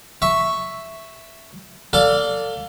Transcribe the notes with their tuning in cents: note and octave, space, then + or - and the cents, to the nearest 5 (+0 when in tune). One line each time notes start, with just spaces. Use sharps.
E5 +0 C#6 +0
A4 +35 D5 -15 F5 +15